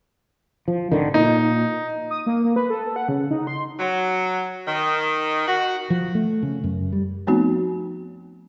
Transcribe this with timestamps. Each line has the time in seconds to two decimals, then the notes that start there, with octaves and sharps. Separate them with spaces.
0.68 F3
0.92 G#1 D3 D#3
1.14 A#2 D#4
2.11 D#6
2.26 A#3
2.44 A#3
2.56 B4
2.70 A4
2.96 F#5
3.08 C#3
3.31 D#4
3.47 C6
3.79 F#3
4.67 D#3
5.47 F#4
5.90 F3
6.15 A3
6.43 C#3
6.64 F#2
6.92 G3
7.27 F3 A3 B3 C4 D#4 F#4